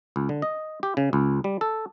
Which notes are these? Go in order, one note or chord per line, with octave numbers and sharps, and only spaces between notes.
C#2
D3
D#5
G4
C#3
C#2
G3
A4